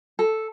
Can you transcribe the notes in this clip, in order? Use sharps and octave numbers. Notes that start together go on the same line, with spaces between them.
A4